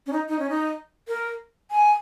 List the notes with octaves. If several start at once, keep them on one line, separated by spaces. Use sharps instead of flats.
C#4
D#4
D#4
C#4
D#4
A#4
G#5